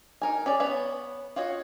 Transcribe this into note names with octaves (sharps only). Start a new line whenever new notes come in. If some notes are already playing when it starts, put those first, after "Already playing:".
D#4 A#4 G#5
C#4 G#4 D5
B3 B4 C#5 B5
F4 F#4 C#5 D#5